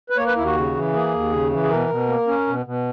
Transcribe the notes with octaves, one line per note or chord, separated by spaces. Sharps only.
B4
A#3 C#5
B4
D#2 E4
F#4
C#3
E3
A#3 G#4
D#2
C#3
E3
G#4
B2 A#4
B2
A#3
C#4
B2
B2